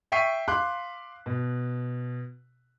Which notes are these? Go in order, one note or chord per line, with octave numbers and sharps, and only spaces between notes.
E5 G5 C#6 B6 C7 D#7
F5 C6 D6 F#6
B2